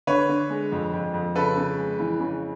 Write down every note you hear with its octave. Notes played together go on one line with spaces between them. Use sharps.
D3 B4 C#5
D3
G#3
F2
F2
F2
C#3 A4 B4
C#3
G#3
E3
C#3